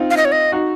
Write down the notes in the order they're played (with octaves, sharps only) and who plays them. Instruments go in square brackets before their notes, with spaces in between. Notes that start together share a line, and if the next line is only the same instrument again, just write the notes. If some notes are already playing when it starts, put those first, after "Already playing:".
Already playing: [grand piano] C4 D#4 F4
[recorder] F5
D#5
C#5
D#5
[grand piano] D#4 F#4